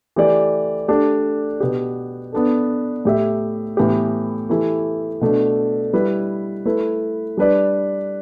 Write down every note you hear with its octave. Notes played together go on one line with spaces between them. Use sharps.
E3 A3 G4 D5
A3 D4 G4 D5
B2 B3 G4
B3 D4 A4
A2 A3 G4 E5
A2 E3 B3 G4
E3 A3 E4 G4
B2 A3 D4
G3 E4 B4
A3 E4 B4
G3 D4 B4 D5